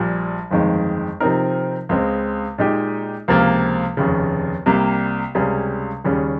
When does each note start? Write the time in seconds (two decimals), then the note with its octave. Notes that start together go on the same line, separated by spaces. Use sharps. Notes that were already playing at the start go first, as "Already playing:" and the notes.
Already playing: A#1 A#2 G3
0.51 G1 F2 D#3 G#3
1.20 C3 F3 C4 D#4 A#4
1.89 C#2 C#3 G#3 C4
2.58 A#2 G#3 D#4 G4
3.28 C#2 C3 F3 A#3 F4
3.97 F1 D#2 C#3
4.66 C2 C3 G3 A#3
5.35 C#2 C3 G3 C#4 G#4
6.04 D#2 C#3 G3 C#4 G#4